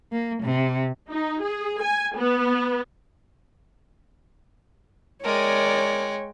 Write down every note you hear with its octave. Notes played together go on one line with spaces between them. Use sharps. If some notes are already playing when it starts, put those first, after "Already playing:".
A#3
C3
D#4
G#4
G#5
B3
G#3 A#4 C#5 D5 G5